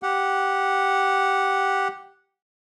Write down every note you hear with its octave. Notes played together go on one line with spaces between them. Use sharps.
G4 F#5